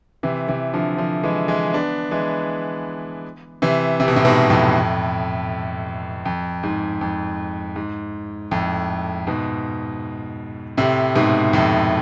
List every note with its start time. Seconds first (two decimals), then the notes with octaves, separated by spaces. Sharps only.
0.23 C3 E3
0.48 C3 E3
0.73 D3 F3
0.98 D3 F3
1.23 E3 G#3
1.48 E3 G#3
1.74 B3 D4
2.11 E3 G#3
3.62 C3 E3
4.00 C3
4.08 B2
4.16 A2 C3
4.25 G#2 B2
4.50 F2 A2
6.25 F2
6.64 G#2
7.01 F2
7.76 G#2
8.51 F2 A2
9.27 G#2 B2
10.77 A2 C3
11.15 G#2 B2
11.53 F2 A2